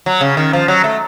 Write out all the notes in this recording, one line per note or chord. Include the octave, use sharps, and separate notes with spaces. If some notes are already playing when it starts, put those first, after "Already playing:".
F#3
C#3
D#3
F3
F#3
A3